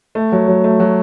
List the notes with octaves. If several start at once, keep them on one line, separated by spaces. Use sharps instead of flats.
A3
F#3
F#3
A3
F#3